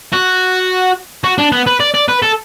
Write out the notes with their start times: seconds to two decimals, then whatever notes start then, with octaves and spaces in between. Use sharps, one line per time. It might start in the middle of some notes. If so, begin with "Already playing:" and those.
0.13 F#4
1.24 F#4
1.38 D4
1.52 B3
1.66 B4
1.80 D5
1.94 D5
2.08 B4
2.22 A4